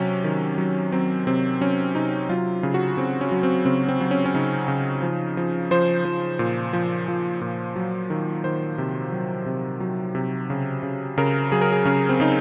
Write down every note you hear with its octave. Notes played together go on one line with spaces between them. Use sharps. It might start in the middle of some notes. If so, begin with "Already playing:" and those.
Already playing: C3 F#3 C#4
D#3
F#3
F#3 C4
C3 C4
F#3 C#4
C3 D#4
F#3 F4
C#3
F#4
C#3 C4
C#4
F#3
C4
C#3 C4
C4
F#3
C#4
C#4
C#3 D#4
C#3
F3
F3
F3 C5
F3
A#2
F3
F3
A#2
F#3
D#3
D#3 C5
C3
F#3
C3
F#3
C3
C#3
C#3
C#3 A#4
F#3 G#4
A#4
G#4
C#3 C#4
C4
C#3 D#4